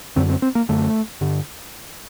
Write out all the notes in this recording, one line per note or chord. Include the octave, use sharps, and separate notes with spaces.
F#2 D3 C4
C4
C4
A#3
F#2 D3 A3
G2 D3